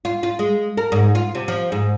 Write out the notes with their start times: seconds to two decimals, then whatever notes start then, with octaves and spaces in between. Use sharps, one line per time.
0.05 F4
0.23 F4
0.39 G#3
0.77 A#4
0.92 G#2
1.15 F4
1.35 C3
1.48 F3
1.72 G#2